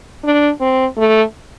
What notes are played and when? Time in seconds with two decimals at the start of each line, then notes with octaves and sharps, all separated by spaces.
0.24 D4
0.61 C4
0.97 A3